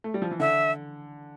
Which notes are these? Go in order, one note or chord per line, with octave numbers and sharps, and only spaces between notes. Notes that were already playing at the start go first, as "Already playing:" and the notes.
A3
G3
F3
E3
D3 E5